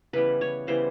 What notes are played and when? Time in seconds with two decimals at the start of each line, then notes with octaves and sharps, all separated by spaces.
0.13 C#3 E3 G3 B3 B4
0.41 C#5
0.67 C#3 E3 G3 B3 C5